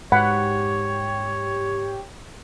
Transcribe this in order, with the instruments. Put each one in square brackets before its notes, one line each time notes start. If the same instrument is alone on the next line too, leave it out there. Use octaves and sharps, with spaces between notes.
[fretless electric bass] G#2 [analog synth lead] G4 [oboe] C#5 [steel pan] F#5 B5